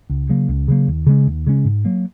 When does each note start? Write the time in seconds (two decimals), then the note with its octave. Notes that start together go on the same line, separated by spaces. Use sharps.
0.09 C#2
0.29 C#3 F#3 A#3
0.48 C#2
0.68 C#3 F#3 A#3
0.87 D#2
1.07 C#3 G#3 C#4
1.27 D#2
1.47 C#3 G#3 C#4
1.65 G#2
1.85 F#3 A#3